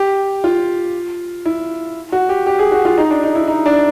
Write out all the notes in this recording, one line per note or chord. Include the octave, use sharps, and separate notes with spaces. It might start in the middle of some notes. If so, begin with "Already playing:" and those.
Already playing: G4
F4
E4
F#4
G4
G4
G#4
F#4
F4
D#4
D4
D#4
E4
D#4
D4